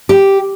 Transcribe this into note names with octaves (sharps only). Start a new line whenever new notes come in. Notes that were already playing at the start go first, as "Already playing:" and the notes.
G4